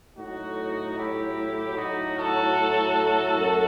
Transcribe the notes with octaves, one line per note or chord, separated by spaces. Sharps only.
A2 F#3 A3 D#4 F#4
E4 G4
A2 F#3 A3 D#4 F#4
F#4 A4
F#2 F#3 A3